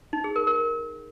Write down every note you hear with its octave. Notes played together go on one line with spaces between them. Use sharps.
D#4
G#4
A#4
A#4